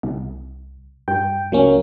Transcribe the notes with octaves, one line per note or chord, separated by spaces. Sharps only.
C2
G2 G5
C#2 F#3 A#3 C#4